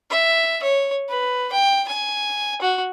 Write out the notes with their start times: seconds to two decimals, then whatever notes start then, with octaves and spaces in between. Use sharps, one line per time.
0.10 E5
0.63 C#5
1.09 B4
1.52 G5
1.88 G#5
2.62 F#4